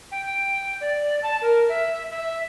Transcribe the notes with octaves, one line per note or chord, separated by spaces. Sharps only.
G5
D5
A5
A#4
E5
E5